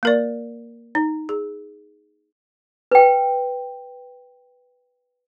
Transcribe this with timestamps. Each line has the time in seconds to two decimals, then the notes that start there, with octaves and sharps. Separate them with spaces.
0.03 A#3 A#4 D5
0.95 D#4
1.29 G#4
2.92 B4 G5